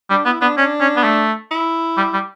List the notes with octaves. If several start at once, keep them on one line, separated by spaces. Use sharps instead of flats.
G3 D4
B3 E4
B3 D4
C#4 D4
C#4
B3
A3
E4
G3
G3